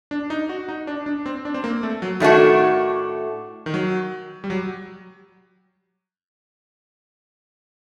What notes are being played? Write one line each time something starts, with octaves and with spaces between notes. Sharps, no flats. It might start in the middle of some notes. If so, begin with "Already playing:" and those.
D4
D#4
F#4
D#4
D4
D4
C4
D4
C4
A#3
A3
F#3
A2 D#3 A3 D4 F#4
D#3
F#3
G3
F#3